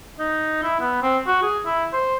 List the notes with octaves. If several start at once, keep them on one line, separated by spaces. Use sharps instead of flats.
D#4
E4
B3
C4
F#4
G#4
E4
C5